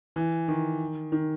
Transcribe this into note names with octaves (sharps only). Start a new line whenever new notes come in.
E3
D#3
D#3